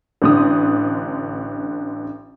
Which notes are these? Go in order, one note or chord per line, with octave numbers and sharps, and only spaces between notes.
A1 D3 D#6